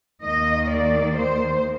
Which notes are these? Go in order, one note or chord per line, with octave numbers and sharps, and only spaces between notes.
D#2 D#3 A#3 D#5
D5
C5